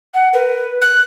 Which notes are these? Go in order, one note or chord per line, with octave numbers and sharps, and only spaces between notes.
F#5
A#4 B4
F#6